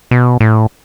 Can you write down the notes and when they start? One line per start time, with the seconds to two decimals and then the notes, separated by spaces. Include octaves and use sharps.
0.11 B2
0.40 A2